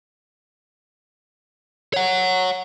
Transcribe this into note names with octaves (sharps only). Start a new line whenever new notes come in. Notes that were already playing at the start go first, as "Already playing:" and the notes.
C#5 F#5